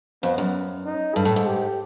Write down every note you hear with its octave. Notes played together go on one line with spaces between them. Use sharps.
F2 B3
F#2
D#4
G2 A4
A2
G#2
G4